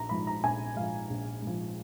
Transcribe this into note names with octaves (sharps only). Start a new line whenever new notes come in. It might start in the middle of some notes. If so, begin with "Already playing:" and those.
Already playing: A#1 A#5
G#2 F3 B5
A#5
A#1 G#5
G#2 F3 F5
A#1
G#2 F3